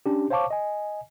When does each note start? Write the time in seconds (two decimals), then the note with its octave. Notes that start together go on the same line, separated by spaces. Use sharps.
0.06 C#4 D4 G4
0.30 C5 C#5 F5 A5 C#6 D6
0.51 D#5 G#5